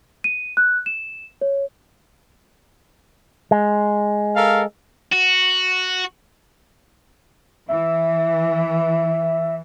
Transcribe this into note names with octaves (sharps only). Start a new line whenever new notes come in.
D#7
F#6
E7
C#5
G#3
A4 A#4 F5
F#4
E3 E5